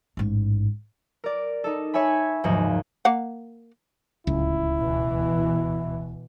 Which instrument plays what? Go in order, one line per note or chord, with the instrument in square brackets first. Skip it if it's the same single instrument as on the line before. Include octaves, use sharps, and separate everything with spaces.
[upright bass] A1 G#2
[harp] A#4 D5
D#4 A4
C#5 E5 G#5 B5
F#1 D#2 G#2 F3 D#4 F#4
[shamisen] A#3 F5 F#5
[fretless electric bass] D1 C#2 [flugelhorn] E4
[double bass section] B2 E3